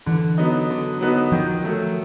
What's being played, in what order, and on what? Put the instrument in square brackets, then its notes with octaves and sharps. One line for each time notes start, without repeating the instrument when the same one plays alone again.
[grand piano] D3 [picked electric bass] E3
[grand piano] F#3 B3 D#4
D3
F#3 B3 D#4
[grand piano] D#3 [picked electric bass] F3
[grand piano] F#3 A3